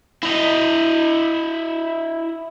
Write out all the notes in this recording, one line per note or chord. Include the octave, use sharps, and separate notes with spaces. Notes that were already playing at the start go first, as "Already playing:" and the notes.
E4 D#5